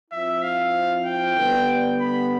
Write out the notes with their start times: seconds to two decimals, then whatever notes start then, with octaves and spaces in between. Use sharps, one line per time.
0.11 F3 C4 E4 E5
0.43 F5
1.06 G5
1.36 D3 G3 B3
1.99 B5